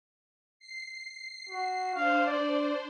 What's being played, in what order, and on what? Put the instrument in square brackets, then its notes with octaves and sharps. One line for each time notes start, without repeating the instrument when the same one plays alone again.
[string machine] C7
[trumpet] F#4
[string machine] D4 C5 [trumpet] F5
[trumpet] D5